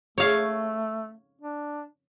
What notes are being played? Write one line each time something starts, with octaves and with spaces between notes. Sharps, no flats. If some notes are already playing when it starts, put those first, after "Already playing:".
A3 C#5 F5
D4